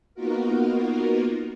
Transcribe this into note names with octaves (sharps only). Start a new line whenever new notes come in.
A#3 B3 D#4 F4 F#4 A#4